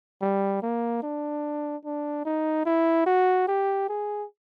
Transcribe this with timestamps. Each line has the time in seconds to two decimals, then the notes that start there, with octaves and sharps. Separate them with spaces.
0.22 G3
0.62 A#3
1.03 D4
1.85 D4
2.25 D#4
2.66 E4
3.06 F#4
3.48 G4
3.89 G#4